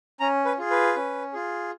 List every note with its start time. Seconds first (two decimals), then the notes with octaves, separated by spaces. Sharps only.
0.20 C#4 A#5
0.45 B4
0.58 F4 G#4
0.70 B4
0.96 C#4
1.33 F4 G#4